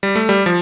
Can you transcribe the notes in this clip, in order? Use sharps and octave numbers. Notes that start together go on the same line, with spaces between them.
G3
A3
G3
F3